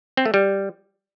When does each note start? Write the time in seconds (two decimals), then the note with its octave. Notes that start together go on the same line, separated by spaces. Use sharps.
0.17 C4
0.26 A3
0.34 G3